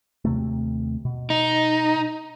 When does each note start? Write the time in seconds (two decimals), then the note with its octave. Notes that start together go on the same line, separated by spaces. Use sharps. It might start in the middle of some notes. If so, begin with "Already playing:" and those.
0.25 D#2 C3 A3
1.05 B2
1.30 D#4